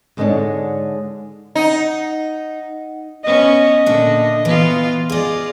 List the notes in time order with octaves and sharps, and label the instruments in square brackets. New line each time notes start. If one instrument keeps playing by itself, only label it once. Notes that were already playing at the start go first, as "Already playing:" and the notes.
[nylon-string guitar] G#2 D3 G#3 A#3 D4 C#5
[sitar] D#4 [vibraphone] D#5 F#5
[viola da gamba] B3 C#4 [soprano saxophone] D#5
[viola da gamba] A#2 D3 [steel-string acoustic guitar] D4 E5
[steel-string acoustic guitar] E3 [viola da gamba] B3 F4
[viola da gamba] F4 D5 [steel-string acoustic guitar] G#4 D#5